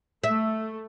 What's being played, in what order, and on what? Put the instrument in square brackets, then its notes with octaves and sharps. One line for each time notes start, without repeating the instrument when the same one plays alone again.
[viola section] A3 [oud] E5